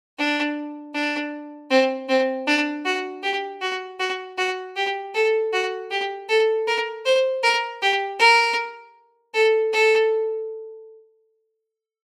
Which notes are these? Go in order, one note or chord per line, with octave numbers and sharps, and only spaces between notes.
D4
D4
C4
C4
D4
F#4
G4
F#4
F#4
F#4
G4
A4
F#4
G4
A4
A#4
C5
A#4
G4
A#4
A4
A4